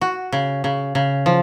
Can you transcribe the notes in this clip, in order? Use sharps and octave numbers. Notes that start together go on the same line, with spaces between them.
F#4
C#3
C#3
C#3
F3